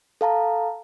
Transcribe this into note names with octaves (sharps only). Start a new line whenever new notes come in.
A4 F5 A5 A#5